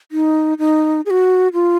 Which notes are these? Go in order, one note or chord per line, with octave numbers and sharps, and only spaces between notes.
D#4
D#4
G#4
F#4
F4